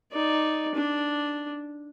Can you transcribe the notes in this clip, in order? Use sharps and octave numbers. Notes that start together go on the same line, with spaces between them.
D#4 D5
D4